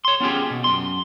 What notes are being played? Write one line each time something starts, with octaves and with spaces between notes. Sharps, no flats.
C#5 C6
B3 C#4 F4 G4 G#4
B2
F#2 C6